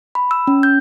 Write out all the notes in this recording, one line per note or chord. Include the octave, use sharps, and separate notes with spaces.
B5
E6
C#4
G6